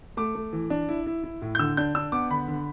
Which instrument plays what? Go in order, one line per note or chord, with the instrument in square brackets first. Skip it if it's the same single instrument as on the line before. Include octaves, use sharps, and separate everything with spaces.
[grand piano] A3 D6
A3
E3
D4
E4
E4
E4
A2
G6
D3 E6
D4 G6
D4 E6
B3 D6
D3 B5
D3